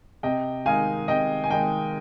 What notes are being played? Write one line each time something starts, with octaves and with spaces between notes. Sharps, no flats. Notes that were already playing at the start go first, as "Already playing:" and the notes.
C3 D#5 G5
D#3 G#3 D#4 F5 G#5
C3 D#5 G5
G#5
D#3 G#3 D#4 D#5 G5